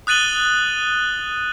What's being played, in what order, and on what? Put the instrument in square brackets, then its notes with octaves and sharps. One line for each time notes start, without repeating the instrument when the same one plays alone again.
[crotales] D#6 F#6 A6 D#7 F#7 G7